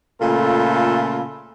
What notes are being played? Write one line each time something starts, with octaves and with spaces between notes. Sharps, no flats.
A#2 C#3 A3 F4 A4 B5